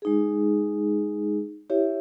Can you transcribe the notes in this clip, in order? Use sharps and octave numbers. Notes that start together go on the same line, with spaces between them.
G#3 D#4 G#4
E4 G4 C#5 E5